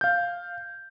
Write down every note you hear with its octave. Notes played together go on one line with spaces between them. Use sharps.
F5 G6